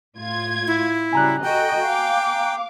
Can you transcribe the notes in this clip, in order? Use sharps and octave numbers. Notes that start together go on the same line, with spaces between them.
A2 F4 G#6
E4
C#3 F#3 G3 G#5 A#5 F#6
F#4 A4 D#5 G5
F5 D6